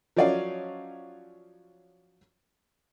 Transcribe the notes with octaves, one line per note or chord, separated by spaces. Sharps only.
F3 F#3 C#4 D5 D#5 F5